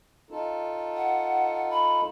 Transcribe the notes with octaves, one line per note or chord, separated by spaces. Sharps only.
D#4 F4 A4
F#5
B5